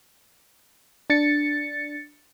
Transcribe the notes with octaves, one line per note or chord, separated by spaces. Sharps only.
D4 A6 C#7